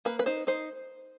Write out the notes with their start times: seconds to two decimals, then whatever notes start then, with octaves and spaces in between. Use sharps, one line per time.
0.05 A#3 B4
0.19 B4
0.26 D#4 C5
0.47 D#4 C5